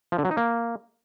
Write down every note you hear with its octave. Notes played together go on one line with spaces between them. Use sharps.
F3
D3
F#3
D#4
A#3